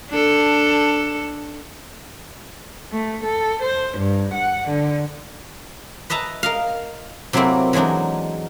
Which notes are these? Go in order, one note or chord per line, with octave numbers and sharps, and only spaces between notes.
D4 A4
A3
A4
C5
G2
F#5
D3
B4 D#5 E5 A5 A#5
A#4 D#5 F5
C3 F#3 A3 A#3 C4 E4
E3 F#3 G#3 D4 D#4